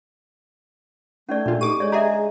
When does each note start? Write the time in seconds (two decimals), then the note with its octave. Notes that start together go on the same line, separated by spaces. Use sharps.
1.29 A3 C#4 D#4 D5
1.46 A#2 D4 F4
1.61 D#4 G4 A4 D6 D#7
1.80 G#3 C#5 D5
1.92 G4 G#4 E5 G#5 A#5